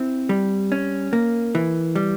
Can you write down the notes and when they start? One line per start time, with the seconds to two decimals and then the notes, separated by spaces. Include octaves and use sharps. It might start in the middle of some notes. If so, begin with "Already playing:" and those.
Already playing: C4 E4
0.29 G3
0.72 C#4
1.13 A#3
1.55 E3
1.95 G3